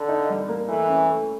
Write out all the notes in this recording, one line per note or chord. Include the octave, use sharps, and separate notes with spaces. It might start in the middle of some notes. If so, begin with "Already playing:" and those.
Already playing: D3
D#4
G3
A#3
E3 A3
C#4
A3